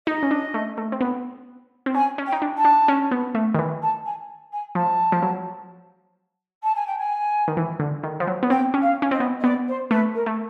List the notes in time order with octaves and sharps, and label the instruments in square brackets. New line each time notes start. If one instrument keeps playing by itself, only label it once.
[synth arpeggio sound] D#4 [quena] D#5
[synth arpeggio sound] C#4
D4
A3
A3
C4
B3
C4
[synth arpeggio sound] C#4 [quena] G#5
[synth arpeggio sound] C#4
[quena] G5
[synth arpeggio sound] D#4
D4
[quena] A5
[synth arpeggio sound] D4
C#4
B3
A3
D#3
E3
[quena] A5
G#5
G#5
[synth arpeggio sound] F3 [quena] A5
[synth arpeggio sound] F3
F#3
[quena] A5
G#5
G5
G#5
[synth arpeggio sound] D#3
E3
D3
D#3
F3
F#3
B3
[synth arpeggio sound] C4 [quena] G5
[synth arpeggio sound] C#4
[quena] F5
[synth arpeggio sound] C#4
[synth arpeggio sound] C4 [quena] D#5
[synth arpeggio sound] B3
[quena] D#5
[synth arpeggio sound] B3 [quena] D5
[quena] C5
[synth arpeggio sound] A3 [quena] B4
[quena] A#4
[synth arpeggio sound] A3